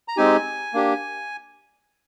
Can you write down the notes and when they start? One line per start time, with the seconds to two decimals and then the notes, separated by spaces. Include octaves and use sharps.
0.08 A#5
0.17 G#3 C4 D#4 G4 G#5
0.74 A#3 D4 G4